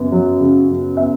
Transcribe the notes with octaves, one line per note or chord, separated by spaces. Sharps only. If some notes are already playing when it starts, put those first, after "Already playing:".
Already playing: F#2 C#3 B3
F#3
C#3
F#2
B3 E5